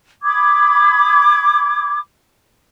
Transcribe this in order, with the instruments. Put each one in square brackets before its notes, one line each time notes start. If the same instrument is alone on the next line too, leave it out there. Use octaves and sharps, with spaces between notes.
[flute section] B5 D6 D#6 G#6